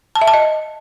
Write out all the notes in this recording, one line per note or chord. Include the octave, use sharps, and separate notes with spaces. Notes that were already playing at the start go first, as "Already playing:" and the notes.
A5
E5
A5
D#5